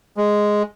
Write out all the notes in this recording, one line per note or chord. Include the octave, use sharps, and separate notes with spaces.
G#3